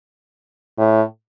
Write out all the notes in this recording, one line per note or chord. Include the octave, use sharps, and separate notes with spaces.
A2